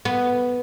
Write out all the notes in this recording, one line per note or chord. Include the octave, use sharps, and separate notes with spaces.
B3